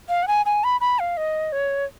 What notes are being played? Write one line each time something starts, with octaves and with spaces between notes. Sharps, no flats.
F5
F#5
G#5
G#5
B5
B5
F5
D#5
C#5